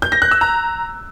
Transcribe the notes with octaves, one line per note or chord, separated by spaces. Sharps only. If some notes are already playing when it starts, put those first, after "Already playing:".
G6
A#6
F#6
E6
A#5